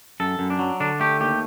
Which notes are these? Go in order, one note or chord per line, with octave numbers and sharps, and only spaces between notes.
F#2 A4
F#2
D4
F#3
D3 D4
A3 G4
D#2 G4